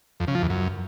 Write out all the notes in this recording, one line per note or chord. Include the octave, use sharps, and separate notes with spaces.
F2
C#3
F3
E2
F#2